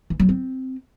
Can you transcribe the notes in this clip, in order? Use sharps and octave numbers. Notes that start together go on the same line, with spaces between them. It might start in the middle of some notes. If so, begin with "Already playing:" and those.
E3
F#3
C4